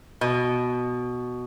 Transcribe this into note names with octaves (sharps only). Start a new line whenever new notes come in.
B2